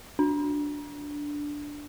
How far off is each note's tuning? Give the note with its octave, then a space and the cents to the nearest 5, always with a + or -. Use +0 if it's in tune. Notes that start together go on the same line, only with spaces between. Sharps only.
D4 -5